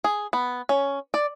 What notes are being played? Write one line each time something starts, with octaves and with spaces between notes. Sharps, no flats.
G#4
B3
C#4
D5